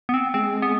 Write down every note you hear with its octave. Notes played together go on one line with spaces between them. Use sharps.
B3
C4
G#3 C4
B3